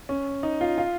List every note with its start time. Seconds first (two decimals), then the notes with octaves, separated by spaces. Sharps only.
0.09 C#4
0.43 D#4
0.61 F4
0.78 F4